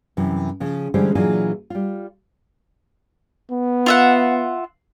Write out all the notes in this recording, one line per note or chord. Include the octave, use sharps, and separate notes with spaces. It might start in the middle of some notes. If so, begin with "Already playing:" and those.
F#2 C3 E3
C#3 F3
D3 E3 G3 G#3 C#4 C5
A#2 E3 F#3 D4 F4 G#4
G3 F4
B3
F4 E5 F#5